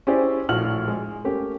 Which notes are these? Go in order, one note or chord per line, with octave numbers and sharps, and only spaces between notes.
C#4 E4 G4 G#4 C5 D5
A#1 A2 F#4 F6 F#7
G#3
A3 A#3 C#4 G4